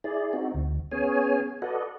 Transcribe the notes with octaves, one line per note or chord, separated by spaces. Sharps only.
E4 G#4 D5
C4 D#4 F#4
D2
B3 C#4 G#4 C#5 G#5
F#4 A4 B4 D5 D#5